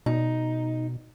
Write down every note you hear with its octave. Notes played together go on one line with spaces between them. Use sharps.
B2 D#4